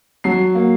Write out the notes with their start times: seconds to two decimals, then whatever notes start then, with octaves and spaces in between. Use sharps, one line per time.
0.24 F#3 C7
0.55 A#3